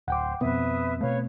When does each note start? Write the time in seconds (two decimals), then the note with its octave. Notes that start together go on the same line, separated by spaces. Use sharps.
0.08 D1 C5 F#5 G5 D6
0.41 F2 B2 B3 C4 B4 E5 D#6
1.01 B2 A3 B4 C#5 F5